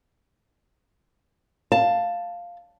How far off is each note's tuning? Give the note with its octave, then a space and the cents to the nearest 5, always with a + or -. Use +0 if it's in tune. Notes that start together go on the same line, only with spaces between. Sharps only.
F5 +0 A5 +10